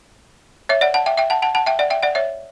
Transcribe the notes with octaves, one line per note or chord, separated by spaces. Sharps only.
C#5 E5
D5 F#5
F#5 A5
E5 G5
E5 G5
F#5 A5
F#5 A5
F#5 A5
E5 G5
D5 F#5
E5 G5
D5 F#5
C#5 E5